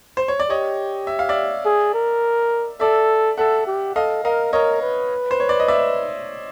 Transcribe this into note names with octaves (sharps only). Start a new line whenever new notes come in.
C5
C#5
D5
G4 C#5 D#5
E5
F5
D5 E5
G#4
A#4
A4 D5 E5
A4 E5 F#5
G4
A4 D#5 F5
A#4 D#5 F5
A#4 C#5 D#5
B4
C5
C#5
D5
D#5
D5 E5